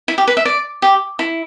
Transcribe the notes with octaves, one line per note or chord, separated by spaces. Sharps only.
E4
G4
B4
E5
D5
G4
E4